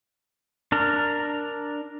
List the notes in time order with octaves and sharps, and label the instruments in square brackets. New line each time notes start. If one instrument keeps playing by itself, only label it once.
[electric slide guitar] D4 A#4